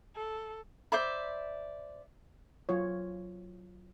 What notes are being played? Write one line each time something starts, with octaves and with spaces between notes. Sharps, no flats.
A4
C5 D5 E5 B5
F#3 F4 C#5